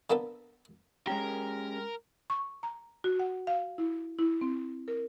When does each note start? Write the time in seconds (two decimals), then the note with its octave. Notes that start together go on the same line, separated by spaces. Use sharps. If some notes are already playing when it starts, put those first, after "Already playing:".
0.10 D3 A#3 B3 A4
1.07 G#3 C#4 G4 A#4
2.30 C#6
2.63 A#5
3.04 F#4
3.19 F#5
3.47 F5
3.78 E4
4.19 E4
4.41 C4
4.88 A#4